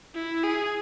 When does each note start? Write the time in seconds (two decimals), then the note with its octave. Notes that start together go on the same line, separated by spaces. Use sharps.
0.15 E4
0.44 G#4